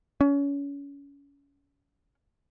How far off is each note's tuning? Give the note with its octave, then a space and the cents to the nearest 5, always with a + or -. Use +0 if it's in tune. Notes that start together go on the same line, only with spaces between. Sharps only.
C#4 +30